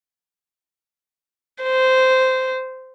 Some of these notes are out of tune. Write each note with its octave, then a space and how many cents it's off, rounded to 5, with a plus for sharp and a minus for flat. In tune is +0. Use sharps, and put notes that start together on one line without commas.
C5 -15